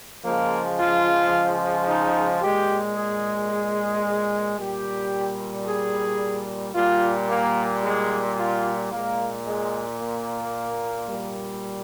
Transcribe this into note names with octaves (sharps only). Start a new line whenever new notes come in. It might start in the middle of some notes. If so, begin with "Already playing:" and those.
C#3 F3 G#3 A#3
F4
D#4
A#2 G#3 G4
G#4
G#4
A#2 G3 G4
G#4
A#2 G3 F4
A#3
G#3
F4
A#2 G#3 A#3
G#3
A#3
A#2 G3